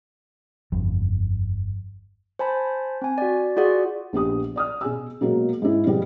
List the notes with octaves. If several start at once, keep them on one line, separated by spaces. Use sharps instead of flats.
G1 F2
C5 G#5 A5 B5
C4 G#5
F#4 D5
F4 F#4 G#4 D5 F#5
A#1 B3 G4 D#6
D5 D#6 F6
B2 G#4 G#5 E6
B2 F#3 G#3 A#3
G#2 E4
B2 F3 G3 G#3 B3